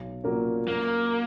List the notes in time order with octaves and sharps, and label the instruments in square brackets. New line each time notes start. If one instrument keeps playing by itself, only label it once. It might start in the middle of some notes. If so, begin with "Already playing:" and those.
Already playing: [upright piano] B1
A#2 F#3 A#3 C#4
[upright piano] F#2 [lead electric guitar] A#3